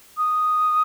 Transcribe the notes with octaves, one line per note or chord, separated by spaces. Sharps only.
D#6